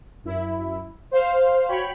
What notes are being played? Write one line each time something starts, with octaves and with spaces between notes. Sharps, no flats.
F#2 E4
C5 F5
F#4 C#5 G5 B5